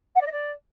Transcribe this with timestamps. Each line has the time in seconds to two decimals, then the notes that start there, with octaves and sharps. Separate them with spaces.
0.15 F#5
0.21 D5
0.26 D#5
0.31 D5